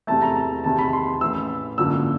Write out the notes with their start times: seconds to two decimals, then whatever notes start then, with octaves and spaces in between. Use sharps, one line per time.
0.07 E2 C3 E3 A3 A5
0.22 A#5
0.36 A5
0.64 E2 C3 D#3 A5
0.79 B5
0.93 C6
1.21 A1 A2 E3 E6
1.78 G#1 F#2 D3 F3 A#3 E6